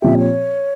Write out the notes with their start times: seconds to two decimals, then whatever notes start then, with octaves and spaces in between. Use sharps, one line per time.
0.02 A#2 F3 C4 G4 E5
0.18 C#5